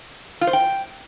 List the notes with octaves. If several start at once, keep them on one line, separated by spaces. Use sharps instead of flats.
F4
C5
G5